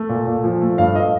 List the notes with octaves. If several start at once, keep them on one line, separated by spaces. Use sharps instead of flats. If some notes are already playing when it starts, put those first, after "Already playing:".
Already playing: A3
A#2
A#2
F3
A3
G2 F5
D#5